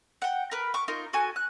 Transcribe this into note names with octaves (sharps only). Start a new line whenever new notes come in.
F#5 G5
A#4 B4
C#6 D6
D#4 F4 A#4
F#4 A4 G#5
F#6